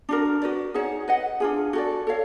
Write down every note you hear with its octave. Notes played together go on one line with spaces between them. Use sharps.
D4 F#4 A#4
F#4 B4 D5
D#4 G#4 C#5 F#5
B4 D#5 F#5
D4 F4 G#4
F#4 A4 D5
A4 C#5 F5